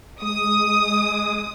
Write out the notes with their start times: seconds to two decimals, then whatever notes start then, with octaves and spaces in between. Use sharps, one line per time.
0.22 G#3 D#6